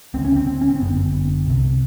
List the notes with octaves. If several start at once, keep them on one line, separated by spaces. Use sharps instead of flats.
D2 C#3 C4
C#4
C4
C4
C#4
C4
G1 F#2 D3 B3
C2 C3